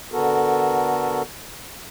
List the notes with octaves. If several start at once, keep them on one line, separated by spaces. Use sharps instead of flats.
D3 B3 F#4 A4 A#4